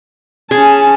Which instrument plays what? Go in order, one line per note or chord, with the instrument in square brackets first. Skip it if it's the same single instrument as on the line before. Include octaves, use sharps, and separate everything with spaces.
[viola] C#4 A5 [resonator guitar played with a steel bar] G#4